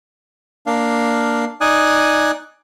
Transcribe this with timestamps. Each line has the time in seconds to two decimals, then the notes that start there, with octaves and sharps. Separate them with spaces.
0.67 A#3 D4 F5
1.61 D#4 D5 G#5 D#6 F#6